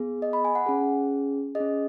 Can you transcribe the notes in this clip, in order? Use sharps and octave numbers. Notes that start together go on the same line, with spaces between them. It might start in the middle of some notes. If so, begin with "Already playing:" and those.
Already playing: B3 G#4
D#5
B5
G#5
F#5
C#4 G#4
G#4 D#5
C#4